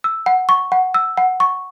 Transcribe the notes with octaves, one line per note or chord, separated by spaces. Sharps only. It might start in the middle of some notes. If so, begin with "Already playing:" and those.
E6
F#5
C#6
F#5
E6
F#5
C#6